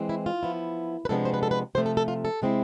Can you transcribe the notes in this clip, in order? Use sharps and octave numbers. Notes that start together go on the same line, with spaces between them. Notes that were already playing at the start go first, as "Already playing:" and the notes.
Already playing: E3 G#3 C4
E4
F4
F3 B3 E4
B4
C3 F3 G#3 B3 D4 A4
C5
B4
A4
B4
C3 F3 A3 C5
A4
A4
F4
A4
C3 G#3 C4 E4